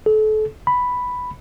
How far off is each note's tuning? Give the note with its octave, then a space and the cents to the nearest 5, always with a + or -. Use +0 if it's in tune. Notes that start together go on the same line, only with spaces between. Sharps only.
A4 -35
B5 +0